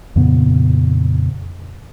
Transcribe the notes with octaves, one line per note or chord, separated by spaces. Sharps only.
F2 A#2 C#3 B3